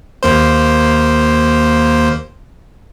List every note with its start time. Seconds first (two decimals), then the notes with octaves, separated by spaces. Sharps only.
0.23 D#2 A#3 C5